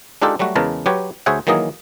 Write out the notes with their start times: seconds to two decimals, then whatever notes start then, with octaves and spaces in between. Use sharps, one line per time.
0.22 G#3 D4 D#4 F4 G4 A4
0.39 F#3 G3 A3 F#4
0.56 E2 C#3 G#3 A#4 B4 A5
0.86 F#3 G4 B4 C#5
1.26 D2 G#4 C5 C#5 E5 F#5
1.47 D#3 E3 F#3 A#3 G#4 D#5